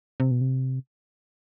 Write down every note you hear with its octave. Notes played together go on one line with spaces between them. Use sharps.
C3
B2
C3